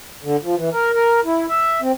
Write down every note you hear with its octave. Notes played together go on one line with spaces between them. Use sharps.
D3
F3
E3
A#4
A#4
E4
E5
C4